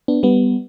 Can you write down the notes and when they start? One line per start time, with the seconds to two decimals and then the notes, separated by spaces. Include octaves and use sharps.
0.08 B3 D4
0.23 G3 B3